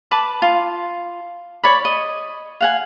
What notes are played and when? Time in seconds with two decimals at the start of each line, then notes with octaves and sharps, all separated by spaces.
0.11 B4 A5 B5 D6
0.42 F4
1.63 C#5 D5 B5
1.85 D#5
2.61 F5 F#5 G#5